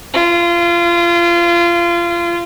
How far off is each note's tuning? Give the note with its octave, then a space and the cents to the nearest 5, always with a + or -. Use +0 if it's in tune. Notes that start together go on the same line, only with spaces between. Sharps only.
F4 -25